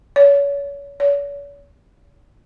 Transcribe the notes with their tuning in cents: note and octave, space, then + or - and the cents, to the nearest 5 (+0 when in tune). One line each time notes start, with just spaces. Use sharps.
C#5 +30
C#5 +45